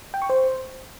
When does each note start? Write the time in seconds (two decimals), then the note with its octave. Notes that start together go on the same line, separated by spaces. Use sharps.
0.14 G5
0.22 C#6
0.30 C5